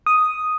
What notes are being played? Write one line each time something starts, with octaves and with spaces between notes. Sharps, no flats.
D#6